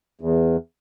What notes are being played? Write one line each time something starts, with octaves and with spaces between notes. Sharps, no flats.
E2